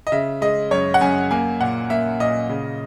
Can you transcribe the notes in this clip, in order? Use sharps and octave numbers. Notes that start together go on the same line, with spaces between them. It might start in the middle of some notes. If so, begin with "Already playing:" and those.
D#5
C#3 E5
G#3 D#5
F#2 C#5
F#5
F#2 G#5
A#3 G#5
A#2 F#5
A#3 E5
A#2 D#5
C#3